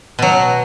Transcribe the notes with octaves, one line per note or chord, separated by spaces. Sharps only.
B2 F#3